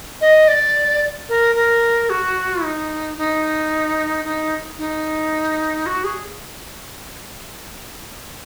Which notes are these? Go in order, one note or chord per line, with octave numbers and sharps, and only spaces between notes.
D#5
D5
A#4
A#4
F#4
D#4
D#4
D#4
D#4
F#4
G#4